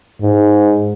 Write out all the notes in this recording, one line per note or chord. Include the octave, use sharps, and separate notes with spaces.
G#2